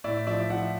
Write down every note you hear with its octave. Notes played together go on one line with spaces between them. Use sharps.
A2 D5 E5
F3 D5 E5
F3 E5 F#5